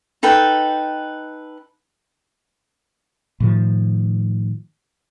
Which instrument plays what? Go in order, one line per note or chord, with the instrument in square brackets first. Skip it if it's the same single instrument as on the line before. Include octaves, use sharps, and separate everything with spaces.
[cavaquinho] D#4 A4 B4 G5
[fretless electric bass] A2 D#3 F3